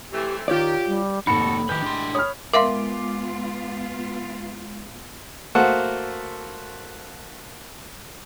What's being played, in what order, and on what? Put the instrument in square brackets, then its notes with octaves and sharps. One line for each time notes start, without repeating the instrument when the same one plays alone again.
[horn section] E3 A3 C4 [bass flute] G4
[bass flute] D#3 [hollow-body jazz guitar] F4 C#5 D5 [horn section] G4
[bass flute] G3
[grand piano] F1 C#7 [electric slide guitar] G#2 F#4 A4 [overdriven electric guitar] A#3 D#4 [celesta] B5
[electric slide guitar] A2 G#3 G4 [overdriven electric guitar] D#3 B4 [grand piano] G6
[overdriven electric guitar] D4 C6
[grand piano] C#5 B5 F6 [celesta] D#6
[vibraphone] G#3 [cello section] B3 F4 [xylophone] A#4 E5 F5 [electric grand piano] C6 D6
[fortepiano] A3 A#3 F#4 C5 F#5